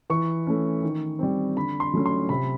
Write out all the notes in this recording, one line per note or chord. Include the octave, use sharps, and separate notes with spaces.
E3 C#6
A3 C#4
D#3
G3 C4
D3 B5
C6
F#3 A3 C#4
C6
C3 B5